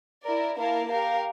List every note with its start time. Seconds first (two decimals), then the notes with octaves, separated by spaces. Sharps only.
0.24 E4 A#4 D5
0.57 A#3 E4 A#4 F5 A5
0.90 G4 A#4 F5